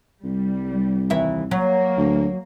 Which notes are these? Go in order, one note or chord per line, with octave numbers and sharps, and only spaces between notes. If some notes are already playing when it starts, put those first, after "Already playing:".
C2 G3
D#2 E3 E5
F#3 A#3
D2